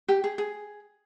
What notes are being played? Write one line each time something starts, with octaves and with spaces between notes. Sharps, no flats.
G4
G#4
G#4